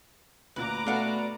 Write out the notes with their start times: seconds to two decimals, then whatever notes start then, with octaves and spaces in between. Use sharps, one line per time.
0.56 D2 A#2 B4 A#5 D6 F#6
0.87 B2 A3 D4 F#4 B4 F5